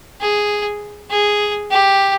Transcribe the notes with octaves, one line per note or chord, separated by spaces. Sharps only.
G#4
G#4
G4